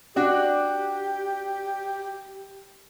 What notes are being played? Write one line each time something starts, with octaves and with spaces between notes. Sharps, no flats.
D4 F#4 G4 D5